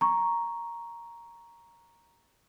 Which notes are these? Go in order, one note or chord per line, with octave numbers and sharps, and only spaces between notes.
A#5 C#6